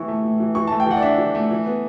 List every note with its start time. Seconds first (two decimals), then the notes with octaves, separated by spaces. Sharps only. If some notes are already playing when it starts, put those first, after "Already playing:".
Already playing: A2 E3 B3 E4 C#6
0.08 A3
0.24 A2
0.40 E3
0.55 E3 C#6
0.67 A3 A5
0.80 G5
0.86 E3 F#5
0.97 D5
1.02 D4 E5
1.18 E3
1.35 A3
1.51 E3
1.66 B3